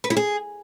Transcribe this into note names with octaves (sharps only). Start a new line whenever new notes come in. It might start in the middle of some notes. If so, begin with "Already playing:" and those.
B4
E4
G#4